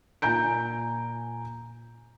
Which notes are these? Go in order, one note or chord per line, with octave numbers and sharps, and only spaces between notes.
A#2 G#5 A#5 G6 D7